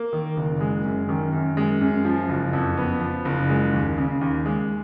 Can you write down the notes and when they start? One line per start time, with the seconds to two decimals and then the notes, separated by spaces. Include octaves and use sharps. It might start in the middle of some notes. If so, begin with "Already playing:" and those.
Already playing: A#3
0.13 D#3
0.37 F#1
0.61 G#3
0.85 F#2
1.09 D#3
1.33 F#2
1.57 G#3
1.81 F#2
2.05 F3
2.29 F#1
2.53 F2
2.77 B3
3.01 F3
3.25 F#1
3.49 G#3
3.73 D#2
3.97 C#3
4.21 D#2
4.46 G#3